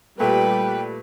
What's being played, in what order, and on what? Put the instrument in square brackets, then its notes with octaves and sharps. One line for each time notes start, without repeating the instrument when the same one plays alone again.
[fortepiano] A#2 A3 [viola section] G3 B4 [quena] G5